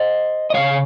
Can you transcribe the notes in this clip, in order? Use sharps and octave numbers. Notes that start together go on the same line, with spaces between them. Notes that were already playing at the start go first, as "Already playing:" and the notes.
Already playing: C5 D#5
D#5
C#3 G3 C#5 F5